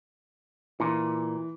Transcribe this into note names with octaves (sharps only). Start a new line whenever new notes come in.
A#2 E3